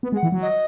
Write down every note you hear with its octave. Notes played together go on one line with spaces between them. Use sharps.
B3
G#3
F#5
E3
F#3
D#5